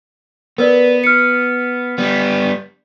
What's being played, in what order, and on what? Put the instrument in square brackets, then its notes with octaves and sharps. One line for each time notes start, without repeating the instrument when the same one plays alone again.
[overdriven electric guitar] B3 [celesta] A#4 B4 D5
[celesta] F6 C#7
[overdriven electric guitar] G3 B3